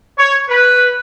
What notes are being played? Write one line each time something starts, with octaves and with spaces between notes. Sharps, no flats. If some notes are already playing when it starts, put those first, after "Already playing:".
C#5
B4